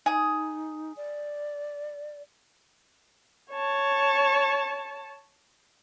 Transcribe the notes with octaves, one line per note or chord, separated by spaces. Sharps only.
D#4 G#4
D5
C#5 A5